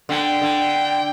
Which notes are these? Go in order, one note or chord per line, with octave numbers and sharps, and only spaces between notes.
D3 G5
D3